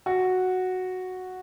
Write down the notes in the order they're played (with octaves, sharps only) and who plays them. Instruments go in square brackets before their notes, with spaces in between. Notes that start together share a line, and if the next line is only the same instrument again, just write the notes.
[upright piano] F#4